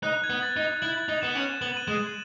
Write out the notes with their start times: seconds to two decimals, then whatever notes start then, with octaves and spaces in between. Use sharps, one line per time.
0.03 D#4 F#6
0.24 G#6
0.30 B3
0.43 A6
0.57 D#4
0.82 E4 F#7
1.09 D#4
1.22 B3 E7
1.35 C#4
1.61 B3 F#7
1.77 D#7
1.88 G#3 E7